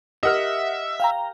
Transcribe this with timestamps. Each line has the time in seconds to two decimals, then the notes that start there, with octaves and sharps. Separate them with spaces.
0.23 G4 A#4 D#5 E5 F#5 F6
1.00 F5 G5 A#5